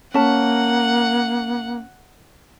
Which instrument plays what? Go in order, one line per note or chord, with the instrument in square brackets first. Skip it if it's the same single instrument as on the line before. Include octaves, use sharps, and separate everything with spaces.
[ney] A#3 [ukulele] C#4 A5 [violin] F#5